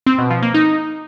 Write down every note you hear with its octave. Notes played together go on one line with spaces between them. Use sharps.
C4
B2
F3
A#3
D#4